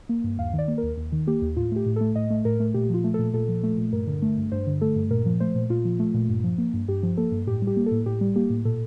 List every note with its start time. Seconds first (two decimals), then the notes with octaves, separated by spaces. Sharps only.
0.09 A#3
0.24 G2
0.38 D#2 F5
0.53 D#3
0.59 D5
0.68 A#3
0.78 A#4
0.83 D#2
0.97 D#2
1.12 D#3
1.27 A#3 G4
1.42 D#2
1.56 A2 F4
1.72 A3 G4
1.86 A2
1.96 A3 A4
2.15 A2 D#5
2.30 A3
2.45 A2 A#4
2.60 A3
2.74 A#2 G4
2.90 F3 F4
3.04 A3
3.14 A#2 A4
3.34 A#2 A4
3.48 F3
3.63 A3
3.78 A#2
3.93 G2 A#4
4.07 D3
4.22 A3
4.37 G2
4.52 G2 C5
4.67 D3
4.81 A3 A4
4.96 G2
5.11 A#2 A#4
5.26 F3
5.40 A3 C5
5.55 A#2
5.70 A#2 F4
5.85 F3
5.99 A3
6.14 A#2
6.29 G2
6.44 F3
6.58 A#3
6.74 G2
6.88 G2 G4
7.03 F3
7.17 A#3 A4
7.32 G2
7.47 A2 G4
7.62 G3
7.67 G4
7.77 A#3
7.86 A4
7.91 A2
8.06 A2 G4
8.21 G3
8.36 A#3 G4
8.50 A2
8.65 A#2 A4